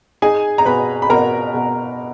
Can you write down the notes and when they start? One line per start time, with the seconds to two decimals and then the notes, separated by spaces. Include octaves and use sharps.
0.22 D#4 G#4 G#5
0.58 A#5
0.66 B2 B4 B5
1.02 B5
1.10 B2 A#4 A#5
1.54 B2